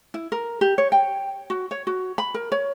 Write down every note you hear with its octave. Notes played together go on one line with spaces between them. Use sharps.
E4
A#4
G4
C#5
G5
F#4
C#5
F#4
B5
A#4
C#5